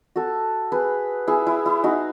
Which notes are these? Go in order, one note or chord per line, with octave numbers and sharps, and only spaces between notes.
F#4 A4
G#4 B4
E4 G#4
E4
E4
D#4 F#4